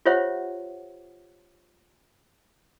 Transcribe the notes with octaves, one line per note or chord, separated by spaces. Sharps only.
F4 G4 C5 C#5 E5 F#5